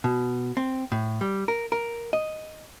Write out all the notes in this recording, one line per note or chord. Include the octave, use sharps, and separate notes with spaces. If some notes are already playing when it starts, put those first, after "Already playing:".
B2
C4
A2
G3
A#4
A#4
D#5